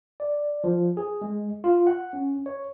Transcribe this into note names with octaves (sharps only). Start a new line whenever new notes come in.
D5
F3
G#4
G#3
F4
F#5
C#4
C#5